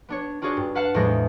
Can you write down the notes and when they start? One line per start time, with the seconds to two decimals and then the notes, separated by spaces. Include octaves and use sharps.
0.09 B3 D4 C#5
0.42 D4 F4 F#4 G#4 C#5 D5
0.57 G2
0.75 B4 F5 F#5 A5 F#6
0.94 E2 A2 F3 G#3 D4 A#6